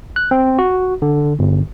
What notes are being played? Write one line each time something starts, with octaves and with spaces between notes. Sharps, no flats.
F#6
C4
F#4
D3
G1